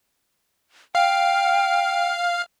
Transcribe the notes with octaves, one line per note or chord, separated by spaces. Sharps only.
F5 G5 F6